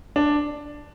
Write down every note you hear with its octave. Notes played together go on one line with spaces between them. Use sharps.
D4